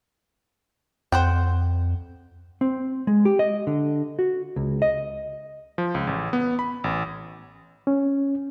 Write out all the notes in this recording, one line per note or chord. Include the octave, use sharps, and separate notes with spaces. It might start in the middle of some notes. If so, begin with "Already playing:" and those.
F2 C5 F#5 G5
C4
G#3
G4
D#5
D3
F#4
C#2
D#5
F3
C#2
A1
B3
B5
A1
C#4